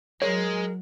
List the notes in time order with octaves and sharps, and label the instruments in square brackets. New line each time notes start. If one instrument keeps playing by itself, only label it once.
[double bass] F#3 [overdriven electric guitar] G#3 [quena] A#4 [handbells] C#5